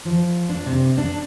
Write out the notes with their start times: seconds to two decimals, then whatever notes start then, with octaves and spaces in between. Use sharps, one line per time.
0.05 F3
0.49 D4
0.66 C3
0.98 D4